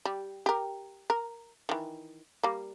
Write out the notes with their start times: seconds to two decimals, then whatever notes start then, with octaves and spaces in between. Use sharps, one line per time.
0.05 G3
0.46 G4 A#4
1.10 A#4
1.69 D#3 E3
2.43 G3 A#3